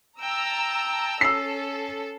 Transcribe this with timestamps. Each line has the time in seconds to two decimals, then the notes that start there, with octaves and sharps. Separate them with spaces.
0.20 G5 A5 A#5 E6
1.21 C#4 A4 E6 C7